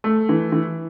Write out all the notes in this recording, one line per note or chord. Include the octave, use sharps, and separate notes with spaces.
A3
E3
E3